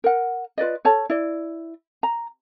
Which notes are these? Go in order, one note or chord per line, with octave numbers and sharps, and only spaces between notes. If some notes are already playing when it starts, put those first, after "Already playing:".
A#4 F#5
F4 B4 D5 D#5
A4 C#5 A5
E4 D5
A#5